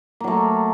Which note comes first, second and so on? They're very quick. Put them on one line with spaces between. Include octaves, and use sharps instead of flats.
A#3 F#3 A3